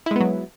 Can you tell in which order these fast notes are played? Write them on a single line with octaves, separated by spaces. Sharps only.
E4 G#3 B3 F#3